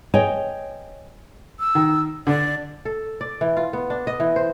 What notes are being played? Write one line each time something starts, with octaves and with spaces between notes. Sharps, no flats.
C#5 D#5 G5 G#5
E6
D#3
D3 D5
A4
D5
E3
F4
B3
D4
D#5
E3
C5